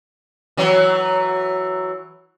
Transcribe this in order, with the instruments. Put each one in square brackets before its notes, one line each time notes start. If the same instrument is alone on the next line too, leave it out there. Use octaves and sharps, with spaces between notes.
[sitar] E3 F#3